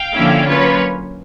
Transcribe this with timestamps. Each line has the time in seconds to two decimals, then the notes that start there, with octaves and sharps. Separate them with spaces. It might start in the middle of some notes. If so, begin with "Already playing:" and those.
Already playing: F5 G5
0.14 D3 F3 A#3 C#4 E4
0.46 F#3 A#3 C#4 F4 B4 C#5